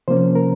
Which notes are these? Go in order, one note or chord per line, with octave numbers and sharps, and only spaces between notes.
C3 F3 A#3 C#4 C5
A#4